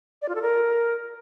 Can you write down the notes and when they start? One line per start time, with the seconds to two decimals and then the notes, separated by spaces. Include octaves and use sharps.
0.22 D5
0.29 F4
0.35 A4
0.42 A#4